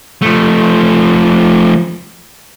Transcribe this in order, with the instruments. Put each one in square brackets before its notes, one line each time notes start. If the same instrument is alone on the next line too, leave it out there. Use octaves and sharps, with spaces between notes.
[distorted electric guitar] F3 A3